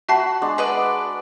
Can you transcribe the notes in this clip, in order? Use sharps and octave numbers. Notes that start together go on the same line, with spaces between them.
F#4 E5 A5 B5 C7
G#3 D4
B4 D5 D#5